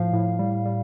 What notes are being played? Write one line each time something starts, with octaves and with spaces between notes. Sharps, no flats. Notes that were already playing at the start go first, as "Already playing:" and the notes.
Already playing: A2 F3 F5
A2
G3
G3